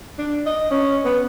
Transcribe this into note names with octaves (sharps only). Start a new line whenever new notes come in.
D4
D#5
C#4
B3